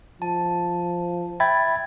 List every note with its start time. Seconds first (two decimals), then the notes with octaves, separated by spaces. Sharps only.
0.22 F3 A5
1.40 E5 G5 B5 G#6 A6